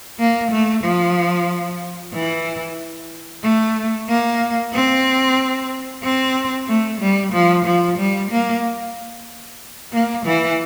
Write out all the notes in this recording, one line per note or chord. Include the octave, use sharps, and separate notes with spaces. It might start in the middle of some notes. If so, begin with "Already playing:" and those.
A#3
A3
F3
E3
A3
A#3
C4
C4
A3
G3
F3
F3
G3
A#3
A#3
E3